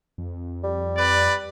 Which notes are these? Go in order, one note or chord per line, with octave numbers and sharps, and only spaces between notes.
F2
G3
B4 D5